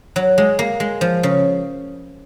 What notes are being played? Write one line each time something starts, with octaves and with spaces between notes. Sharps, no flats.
F#3
G#3
A#3
G#3
F3
C#3